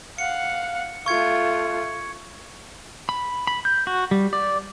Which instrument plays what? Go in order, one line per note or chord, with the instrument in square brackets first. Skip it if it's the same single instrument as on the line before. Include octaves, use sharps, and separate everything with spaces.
[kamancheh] F5 F#5 [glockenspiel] C#7
[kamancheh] A3 F4 [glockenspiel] C#6 G#6 C#7
[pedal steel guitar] B5
B5
G6
F#4
G3
D5